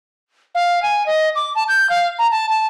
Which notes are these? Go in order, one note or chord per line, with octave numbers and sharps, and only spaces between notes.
F5
G#5
D#5
D6
A5
G6
F5
A#5
A5
A5